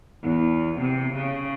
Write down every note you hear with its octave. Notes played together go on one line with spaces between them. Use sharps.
E2
C3
C#3